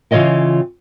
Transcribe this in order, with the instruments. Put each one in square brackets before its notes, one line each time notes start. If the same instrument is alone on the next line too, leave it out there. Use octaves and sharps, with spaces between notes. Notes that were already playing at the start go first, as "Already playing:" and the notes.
[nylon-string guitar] C#3 E3 F4 C#5 D#5 G5